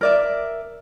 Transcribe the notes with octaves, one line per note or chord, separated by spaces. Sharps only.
A#4 D5 E5